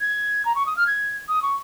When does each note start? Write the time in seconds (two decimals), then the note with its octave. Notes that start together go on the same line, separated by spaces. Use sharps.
0.01 G#6
0.45 A#5
0.55 C#6
0.66 D#6
0.77 F6
0.87 G#6
1.29 D#6
1.43 C#6